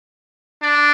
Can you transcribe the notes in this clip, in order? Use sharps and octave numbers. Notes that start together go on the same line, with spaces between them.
D4